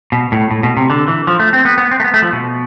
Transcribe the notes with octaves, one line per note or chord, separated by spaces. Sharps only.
B2
A2
A2
B2
C3
D3
E3
F3
A3
C4
B3
B3
C4
A3
B3
A3
F3
B2